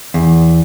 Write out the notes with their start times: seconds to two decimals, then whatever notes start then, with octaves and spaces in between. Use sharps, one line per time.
0.14 E2